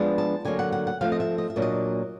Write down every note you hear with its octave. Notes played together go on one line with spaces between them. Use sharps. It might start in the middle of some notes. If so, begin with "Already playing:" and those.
Already playing: F3 G#3 B3 D4
A5
D3 F#3 A#3 G#5
F#5
F#5
F#5
F3 A3 C4 F5
D#5
E5
D#5
E5
A#2 F#3 A#3 D4
D#5